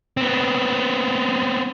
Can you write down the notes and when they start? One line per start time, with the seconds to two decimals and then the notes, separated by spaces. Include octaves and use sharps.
0.17 B3 C4